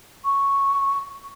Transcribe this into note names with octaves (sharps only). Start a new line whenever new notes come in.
C#6